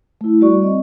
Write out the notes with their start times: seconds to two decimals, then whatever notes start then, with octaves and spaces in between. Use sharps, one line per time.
0.21 A3 E4
0.41 G3 F#4 D5 C#6
0.63 C4 D#5